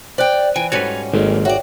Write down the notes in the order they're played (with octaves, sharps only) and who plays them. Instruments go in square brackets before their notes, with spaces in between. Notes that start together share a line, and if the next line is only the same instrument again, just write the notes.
[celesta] C5 F#6 [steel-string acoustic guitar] D5 G5
[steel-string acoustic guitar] E3 [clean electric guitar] G5 G#5
[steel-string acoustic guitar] G#2 G3 C#4 [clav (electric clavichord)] F#4 A4 B4 [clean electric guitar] C#5
[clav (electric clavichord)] G#1 [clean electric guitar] D#3 G#3 A#3 [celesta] A4 D#5
[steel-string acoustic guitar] F#4 D5 [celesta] C#5 E5 G5